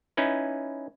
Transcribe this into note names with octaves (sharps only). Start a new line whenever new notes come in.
C#4 D#4 E4 B4